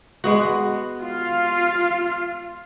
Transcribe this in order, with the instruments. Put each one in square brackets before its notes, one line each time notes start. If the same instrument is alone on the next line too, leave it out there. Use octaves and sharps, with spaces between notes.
[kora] G#3 B3 F#4
[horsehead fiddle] F4 F5